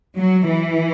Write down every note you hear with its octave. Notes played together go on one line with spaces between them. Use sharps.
F#3
E3